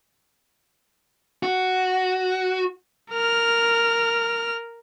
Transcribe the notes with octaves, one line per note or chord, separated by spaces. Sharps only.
F#4
A#4 F6